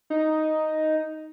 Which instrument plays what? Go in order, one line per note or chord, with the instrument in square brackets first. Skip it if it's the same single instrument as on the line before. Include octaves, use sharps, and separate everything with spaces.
[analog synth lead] D#4